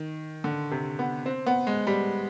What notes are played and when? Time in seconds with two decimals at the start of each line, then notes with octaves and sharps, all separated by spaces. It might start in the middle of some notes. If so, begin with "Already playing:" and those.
Already playing: D#3
0.44 D3
0.71 C3
0.99 B3
1.26 C4
1.46 B3
1.67 G#3
1.87 G3